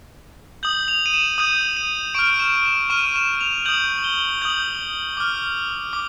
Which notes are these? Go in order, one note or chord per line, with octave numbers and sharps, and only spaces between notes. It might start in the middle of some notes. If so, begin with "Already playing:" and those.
D#6 G6 F#7
F7
D#7
E7
D#6 G6 D#7
D#7
C#6 F6 D7
E7
E7
C#6 F6 D#7
E7
F7
D#6 G6 F#7
G7
D#6 G6 F#7
D6 F6
D6